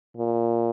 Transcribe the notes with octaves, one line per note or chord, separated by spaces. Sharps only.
A#2